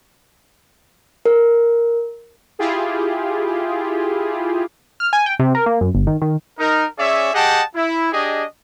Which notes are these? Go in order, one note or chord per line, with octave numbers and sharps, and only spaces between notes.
A#4
E4 F4 G4 G#4
F6
G#5
G5
C3
A#4
A#3
F#2
G1
D#3
D#3
D#4 A#4
C#4 G#4 C#5 D5 E5
G4 G#4 D#5 F#5 G5 A5
E4
D4 G4 G#4 D#5